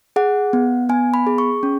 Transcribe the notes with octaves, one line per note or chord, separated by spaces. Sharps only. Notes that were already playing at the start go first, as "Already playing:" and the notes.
G#4 F#5
B3
B3 G#5
B5
G#4
C#6
C#4